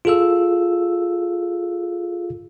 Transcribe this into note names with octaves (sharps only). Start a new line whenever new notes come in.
F4 G#4 A4 F5 E6